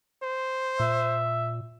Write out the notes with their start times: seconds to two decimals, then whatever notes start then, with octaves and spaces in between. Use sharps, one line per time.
0.23 C5
0.80 A#2 E5